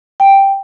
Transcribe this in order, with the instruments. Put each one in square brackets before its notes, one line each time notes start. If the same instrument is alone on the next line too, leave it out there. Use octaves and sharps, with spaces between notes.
[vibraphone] G5